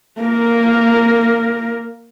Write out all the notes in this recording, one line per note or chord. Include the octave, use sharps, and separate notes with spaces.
A#3 A#4